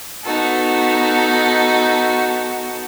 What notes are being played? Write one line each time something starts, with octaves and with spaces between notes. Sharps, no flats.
B3 D#4 F#4 A4